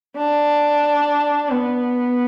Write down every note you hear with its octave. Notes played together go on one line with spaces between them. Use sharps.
D4
B3